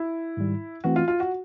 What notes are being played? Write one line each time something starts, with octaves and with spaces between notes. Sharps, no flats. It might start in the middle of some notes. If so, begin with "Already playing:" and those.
Already playing: E4
G#2 D#3 G3
E3 A3 C4 F#4
F4
F4
F#4